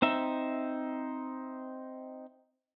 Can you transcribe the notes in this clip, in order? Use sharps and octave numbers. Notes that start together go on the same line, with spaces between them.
C4 D#4 E5